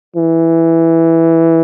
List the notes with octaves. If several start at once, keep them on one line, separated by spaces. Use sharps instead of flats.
E3